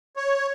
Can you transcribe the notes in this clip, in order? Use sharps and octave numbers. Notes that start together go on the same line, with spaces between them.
C#5